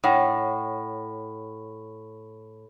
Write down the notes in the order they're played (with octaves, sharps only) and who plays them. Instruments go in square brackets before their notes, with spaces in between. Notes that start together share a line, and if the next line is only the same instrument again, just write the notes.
[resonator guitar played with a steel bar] A2 [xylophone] C#5 F#5 G5